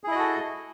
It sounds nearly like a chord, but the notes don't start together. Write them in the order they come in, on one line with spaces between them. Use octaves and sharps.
G#4 E4 D#5 F#4 A4